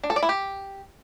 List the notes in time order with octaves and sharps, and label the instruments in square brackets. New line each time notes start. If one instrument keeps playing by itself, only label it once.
[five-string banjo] D4
A4
D5
E4
G4